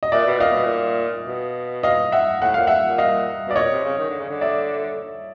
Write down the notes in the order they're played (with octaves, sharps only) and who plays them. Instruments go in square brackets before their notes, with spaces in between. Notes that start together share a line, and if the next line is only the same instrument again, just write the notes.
[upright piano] D#5
[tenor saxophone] A#2 [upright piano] D5 E5
[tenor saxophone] B2
[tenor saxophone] A#2 [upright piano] D#5 F5
[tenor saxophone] B2
A#2
B2
[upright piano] D#5 F5
E5 F#5
[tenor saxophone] A2 [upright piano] F#5
[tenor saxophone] A#2 [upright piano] F5
[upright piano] E5 F#5
[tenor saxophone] A#2
[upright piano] D#5 F5
[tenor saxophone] B2 [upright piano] D5
[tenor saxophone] A#2 [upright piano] C#5 D#5
[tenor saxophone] C3
C#3
D#3
D3
C#3
D3
[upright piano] D5 E5